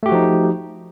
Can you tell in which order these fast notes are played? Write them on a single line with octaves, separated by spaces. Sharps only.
A3 G4 F#4 F3 D#4